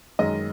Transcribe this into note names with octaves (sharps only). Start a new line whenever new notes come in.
F#2 D#3 G#3 D#5